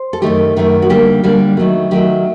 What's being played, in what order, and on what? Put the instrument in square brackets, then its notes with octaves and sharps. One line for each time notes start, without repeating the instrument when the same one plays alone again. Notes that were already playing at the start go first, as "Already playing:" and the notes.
Already playing: [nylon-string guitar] C5
A4
F#2 D#3 A3 G4
F#2 D#3 A3
F#4
D3 G3 A#3 G4
D3 G3 A#3
D#3 F#3 A3
D#3 F#3 A3 G4